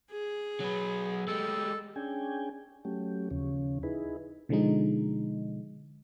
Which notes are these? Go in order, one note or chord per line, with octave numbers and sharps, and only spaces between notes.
G#4
F#3 B3
G3 G#3 A4
C#4 D4 G#4 G5 G#5
F#3 A3 C#4 G4
D#2 C#3 F3 C#4
D#4 E4 G#4 B4
B2 D3 F3 G#3 D#4